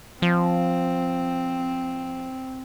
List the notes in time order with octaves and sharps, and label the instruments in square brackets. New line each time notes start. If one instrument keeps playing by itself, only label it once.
[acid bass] F3 [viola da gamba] C4